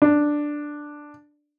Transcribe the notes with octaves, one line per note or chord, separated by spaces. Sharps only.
D4